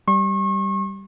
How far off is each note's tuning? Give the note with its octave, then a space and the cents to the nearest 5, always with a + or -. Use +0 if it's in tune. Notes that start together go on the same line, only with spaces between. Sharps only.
G3 +0 C#6 -40